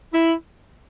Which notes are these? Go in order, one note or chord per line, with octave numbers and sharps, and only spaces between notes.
E4